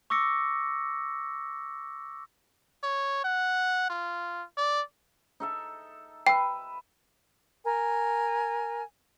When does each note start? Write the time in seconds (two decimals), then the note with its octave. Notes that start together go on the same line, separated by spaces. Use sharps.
0.10 C#6 D6 E6 A#6 C#7
2.83 C#5
3.24 F#5
3.90 F4
4.57 D5
5.40 D#4 A4 E5
6.27 B4 E5 G5
7.65 A#4 G#5